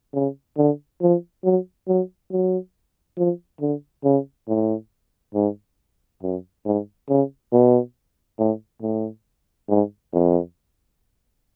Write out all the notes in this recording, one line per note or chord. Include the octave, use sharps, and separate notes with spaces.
C#3
D3
F3
F#3
F#3
F#3
F3
D3
C#3
A2
G#2
F#2
G#2
C#3
B2
A2
A2
G#2
F2